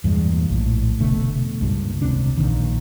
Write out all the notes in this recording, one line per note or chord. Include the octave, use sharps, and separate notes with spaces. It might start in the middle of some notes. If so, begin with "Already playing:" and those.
E2 G2 A#2 G#3
A#1 A2
F1 B2 D3 A3
C#2 G2 A#2
D#1 C#2 C3 D4
A#1 E2 A#2 D#3